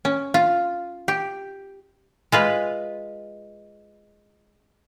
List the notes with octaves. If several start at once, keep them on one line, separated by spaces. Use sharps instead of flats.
C#4
F4
G4
G#3 F4 B4